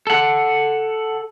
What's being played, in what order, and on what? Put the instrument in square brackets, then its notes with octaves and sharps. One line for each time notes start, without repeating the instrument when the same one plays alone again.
[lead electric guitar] A4 F#5